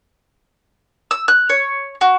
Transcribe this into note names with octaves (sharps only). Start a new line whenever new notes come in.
E6
F#6
C#5
F#4